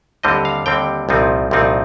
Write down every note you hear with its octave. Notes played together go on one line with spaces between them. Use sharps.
D#2 D3 G3 C4 D#5
F5
D#2 D3 G3 C4 G5
C2 A#2 F3 C4 D#4
C2 A#2 F3 C4 D#4